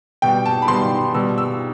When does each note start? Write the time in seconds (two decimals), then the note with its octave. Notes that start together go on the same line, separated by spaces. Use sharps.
0.22 B2 G3 G5
0.46 A5
0.62 B5
0.68 B2 G3 C6
1.14 B2 G3 E6
1.38 E6